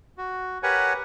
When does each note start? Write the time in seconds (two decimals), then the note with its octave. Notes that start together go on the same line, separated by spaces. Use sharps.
0.18 F#4
0.63 G4 A#4 B4 C#5 F#5 G#5